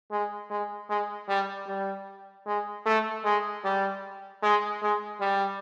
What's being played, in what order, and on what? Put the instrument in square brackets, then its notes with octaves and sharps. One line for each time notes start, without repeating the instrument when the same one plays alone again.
[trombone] G#3
G#3
G#3
G3
G3
G#3
A3
G#3
G3
G#3
G#3
G3